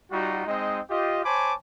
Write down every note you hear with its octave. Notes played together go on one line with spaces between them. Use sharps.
G3 D#4 F4 F#4
G#3 C4 D#4 D#5
F4 G4 D#5
C5 C#5 G#5 A5 B5 D6